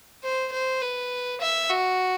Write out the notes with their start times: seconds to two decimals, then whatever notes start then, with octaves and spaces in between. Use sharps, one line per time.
0.23 C5
0.52 C5
0.81 B4
1.41 E5
1.70 F#4